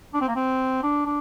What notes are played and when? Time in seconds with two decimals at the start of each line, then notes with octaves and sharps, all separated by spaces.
0.14 D4
0.21 C4
0.28 A#3
0.35 C4
0.83 D4
1.05 D4